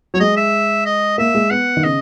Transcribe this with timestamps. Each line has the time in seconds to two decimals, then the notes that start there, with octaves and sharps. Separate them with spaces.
0.14 F#3 C#5
0.20 G#3 D#5
0.37 E5
0.86 D#5
1.18 A#3 E5
1.35 G#3
1.51 B3 F#5
1.77 D#3
1.84 C#3 D#5